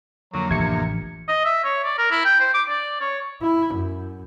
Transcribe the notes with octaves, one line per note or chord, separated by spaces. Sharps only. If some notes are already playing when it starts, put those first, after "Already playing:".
F2 D3 F#3 A#3
A1 C3 F3 D4 G#6 C#7
D#5
E5
C#5
D5
A#4
E4
G5
C5
D6
D5
C#5
E4
F#2